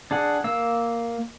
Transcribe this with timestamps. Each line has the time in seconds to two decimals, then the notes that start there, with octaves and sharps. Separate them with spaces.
0.11 D4 G#4 F#5
0.44 A#3 F5 E6